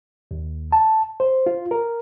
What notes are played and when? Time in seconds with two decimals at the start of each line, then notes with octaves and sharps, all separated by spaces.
0.31 D#2
0.72 A5
1.20 C5
1.46 F4
1.71 A#4